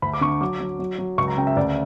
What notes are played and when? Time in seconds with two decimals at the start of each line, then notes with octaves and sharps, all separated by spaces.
0.02 D2 B5
0.13 D6
0.21 D3 C#6
0.41 F#3 D6
0.60 F#3
0.79 F#3
0.98 F#3
1.18 C#2 C#6
1.28 A#5
1.37 C#3 G5
1.47 E5
1.57 D2 D5